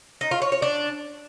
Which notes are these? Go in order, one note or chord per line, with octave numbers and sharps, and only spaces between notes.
D#4
F4
C#5
C#5
D4